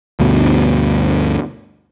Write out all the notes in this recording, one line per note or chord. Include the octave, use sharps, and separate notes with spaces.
D2 G2 B2